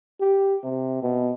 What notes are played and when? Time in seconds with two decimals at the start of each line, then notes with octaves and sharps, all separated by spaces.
0.20 G4
0.64 C3
1.02 B2